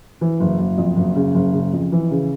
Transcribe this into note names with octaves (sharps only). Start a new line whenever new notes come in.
E3
F#1
F#1
F2
F#1
C#3
F#1
C#3
F2
E3
C#3